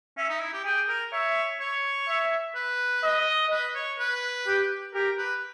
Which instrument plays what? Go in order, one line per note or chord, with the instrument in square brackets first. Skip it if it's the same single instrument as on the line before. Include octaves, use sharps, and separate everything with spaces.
[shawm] C#4 [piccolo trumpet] E5
[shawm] D#4
E4
G4
[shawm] G#4 [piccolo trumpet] G5
[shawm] A#4
[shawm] C#5 [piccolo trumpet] E5
[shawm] C#5
[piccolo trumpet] E5
[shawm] B4
[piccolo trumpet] D#5
[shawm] B4
C#5
B4
[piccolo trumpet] G4
[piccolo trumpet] G4 [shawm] A#4
[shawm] B4